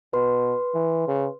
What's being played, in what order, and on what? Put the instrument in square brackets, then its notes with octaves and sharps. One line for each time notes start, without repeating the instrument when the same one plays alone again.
[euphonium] B2 [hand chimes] B4 C6
[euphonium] E3
C#3